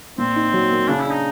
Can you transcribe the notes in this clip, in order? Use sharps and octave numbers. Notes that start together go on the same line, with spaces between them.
A#2 C4
D#4
F#3
A#3
C#3 D4
E4
D4
D#4